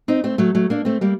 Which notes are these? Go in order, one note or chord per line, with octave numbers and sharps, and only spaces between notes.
C4 D#4
A3 C4
F#3 A3
F#3 A3
A#3 D4
A3 C4
G3 A#3